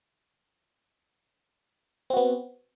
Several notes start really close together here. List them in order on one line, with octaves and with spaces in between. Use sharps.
C4 F#4 B3